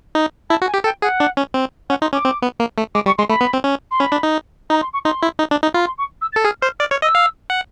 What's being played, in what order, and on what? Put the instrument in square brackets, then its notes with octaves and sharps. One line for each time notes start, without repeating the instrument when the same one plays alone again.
[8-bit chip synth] D#4
[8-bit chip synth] E4 [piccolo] A5
[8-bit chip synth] F#4
[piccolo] G#5
[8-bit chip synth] G4
[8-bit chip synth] A4 [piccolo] G5
[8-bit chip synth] G#4 [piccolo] F#5
[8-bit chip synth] D4
C#4
C4
[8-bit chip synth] C#4 [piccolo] F#5
[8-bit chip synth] D#4 [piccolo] C6
[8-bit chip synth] C#4 [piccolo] D6
[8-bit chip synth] C4
B3
A#3
A3
[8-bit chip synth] G#3 [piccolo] D6
[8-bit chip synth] G3 [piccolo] C#6
[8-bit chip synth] G#3 [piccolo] C6
[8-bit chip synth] A3 [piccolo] B5
[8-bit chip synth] B3
C4
C#4
[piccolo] C6
[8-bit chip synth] C#4 [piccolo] B5
[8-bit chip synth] D4
D#4
[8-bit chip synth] D#4 [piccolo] A#5
[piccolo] C6
C#6
[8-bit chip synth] D#4 [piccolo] C6
[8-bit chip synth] E4
D#4
D4
D#4
[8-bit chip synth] F4 [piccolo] B5
[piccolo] C6
C#6
E6
A6
[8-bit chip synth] A4
[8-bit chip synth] G#4 [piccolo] F6
[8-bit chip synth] C5 [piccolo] F6
[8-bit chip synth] D5 [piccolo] F6
[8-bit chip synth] C#5 [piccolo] F6
[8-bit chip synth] D#5 [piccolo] E6
[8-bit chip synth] F5
F#5